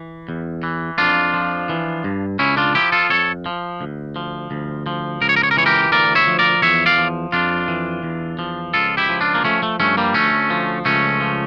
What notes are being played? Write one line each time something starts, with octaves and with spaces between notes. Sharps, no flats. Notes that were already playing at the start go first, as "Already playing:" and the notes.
Already playing: E3
E2
E3
F2 D4 F4
F3
E3
G2
C#2 C#4 E4
D4 F4
F3 E4 G4
F4 A4
F2 A4 C#5
F3
D2
F3
D2
F3
C#2 A#4
C#5
A#4
C#5
A#4
E3 C#5
G4 A#4
D2 A#4 D5
C#5 E5
F3
A#4 D5
E2 C#5 E5
D5 F5
F3
F2 D4 F4
E3
E2
F3
C#2 F4 A4
E4 G4
F3
D4 F4
A#3
F3 A3 C#4
A3
G2 A3 C#4
G3 A#3
D2 A3 C#4
F3
C#2 A3 C#4
F3